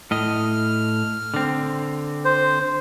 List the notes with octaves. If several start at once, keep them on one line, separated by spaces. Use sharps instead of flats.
A2 D#5 F6
D3 C4
C5